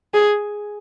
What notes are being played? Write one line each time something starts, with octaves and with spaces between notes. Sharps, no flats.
G#4